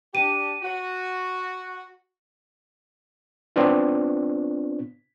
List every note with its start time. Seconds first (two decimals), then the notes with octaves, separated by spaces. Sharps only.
0.15 D4 G4 D#7
0.62 F#4
3.56 B3 C4 D4 F4